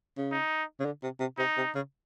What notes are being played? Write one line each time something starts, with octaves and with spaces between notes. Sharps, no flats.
C#3
D#4
C#3
D3
C3
C3
C3 D#4
C3
C#3